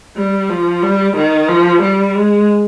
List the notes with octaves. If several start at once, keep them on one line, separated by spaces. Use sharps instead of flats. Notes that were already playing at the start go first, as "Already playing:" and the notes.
G3
F3
G3
D#3
F3
G3
G#3